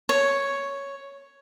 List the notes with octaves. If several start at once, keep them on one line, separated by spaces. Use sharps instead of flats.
C#5